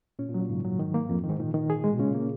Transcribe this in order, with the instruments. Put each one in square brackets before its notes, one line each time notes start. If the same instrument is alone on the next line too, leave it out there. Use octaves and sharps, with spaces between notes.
[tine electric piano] A#2 [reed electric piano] C#4
[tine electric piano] A#2
[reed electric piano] F#3
[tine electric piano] A#2
[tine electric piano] G#2 [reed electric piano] C#3
[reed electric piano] F#3
D#3
A#3
F2
D#3
[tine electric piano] G#2
[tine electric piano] A#2 [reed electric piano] D#3
[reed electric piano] D#3
G#4
G#3
[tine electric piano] B2
[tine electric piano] A#2 C#3 [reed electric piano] C#4
[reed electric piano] A#3